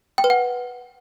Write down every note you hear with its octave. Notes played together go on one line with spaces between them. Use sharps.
G5
B4
F#5